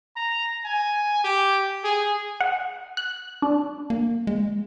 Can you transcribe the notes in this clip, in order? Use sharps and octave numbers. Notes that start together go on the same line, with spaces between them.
A#5
G#5
G4
G#4
F#5
F#6
D4
A#3
G#3